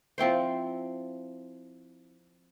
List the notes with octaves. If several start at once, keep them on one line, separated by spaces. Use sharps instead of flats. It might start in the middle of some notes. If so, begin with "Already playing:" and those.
F3 C4 E4 C5